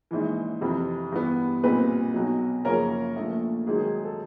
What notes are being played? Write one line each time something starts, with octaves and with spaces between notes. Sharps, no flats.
A#1 G#2 E3
F2 C3 E3
G2 E3 G3 B3
B1 A#2 G3 C4 B4
B1 B2 F#3
F#2 C#3 F3 A#3 C#4 A#4
A#1 A#2 F3 A3
G#2 D#3 F#3 G#4
G#4
A4